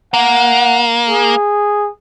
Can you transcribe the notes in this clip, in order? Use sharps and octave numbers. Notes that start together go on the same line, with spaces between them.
A#3 F#5
G#4